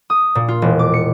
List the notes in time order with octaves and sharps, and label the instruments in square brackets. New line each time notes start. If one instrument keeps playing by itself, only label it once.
[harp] D#6
A#2
F4
E1
D6
C#7